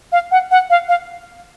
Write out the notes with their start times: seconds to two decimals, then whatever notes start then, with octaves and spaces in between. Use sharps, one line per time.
0.12 F5
0.31 F#5
0.51 F#5
0.70 F5
0.88 F5